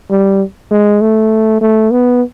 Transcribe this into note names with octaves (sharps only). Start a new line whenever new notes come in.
G3
G#3
A3
A3
B3